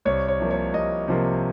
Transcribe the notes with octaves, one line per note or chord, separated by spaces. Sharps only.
C2 C#5
C#5
C3 F3 A#3
C#5
C2 D#5
C3 F3 A#3